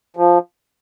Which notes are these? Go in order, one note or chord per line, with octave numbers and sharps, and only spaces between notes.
F3